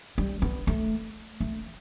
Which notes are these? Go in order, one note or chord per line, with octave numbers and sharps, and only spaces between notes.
G3
B3
A3
A3